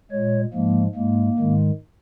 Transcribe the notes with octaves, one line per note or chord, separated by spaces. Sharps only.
A#2 G#3 C#5
G#2 F3 G#3 A#3
G#2 G#3 A#3
G#2 D#3 G#3